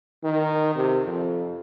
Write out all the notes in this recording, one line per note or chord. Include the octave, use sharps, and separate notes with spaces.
D#3
C3
F2